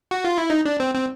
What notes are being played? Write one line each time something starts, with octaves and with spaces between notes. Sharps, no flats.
F#4
F4
E4
D#4
D4
C4
C4